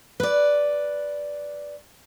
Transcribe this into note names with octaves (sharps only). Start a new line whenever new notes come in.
B4 D5